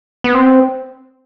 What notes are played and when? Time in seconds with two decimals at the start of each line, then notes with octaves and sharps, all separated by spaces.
0.24 B3
0.34 C4